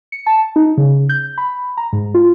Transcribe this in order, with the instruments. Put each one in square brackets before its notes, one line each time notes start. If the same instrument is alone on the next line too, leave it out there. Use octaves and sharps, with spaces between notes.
[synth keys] C#7
A5
D#4
C#3
G6
B5
A#5
G#2
F4